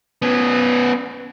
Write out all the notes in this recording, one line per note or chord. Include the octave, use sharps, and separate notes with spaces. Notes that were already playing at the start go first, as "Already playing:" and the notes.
B3 C#4